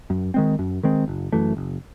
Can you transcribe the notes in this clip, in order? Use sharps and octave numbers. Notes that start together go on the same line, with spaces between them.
F#2
D#3 G#3 C4
F#2
D#3 G#3 C4
F#1
F#2 E3 A3
F#1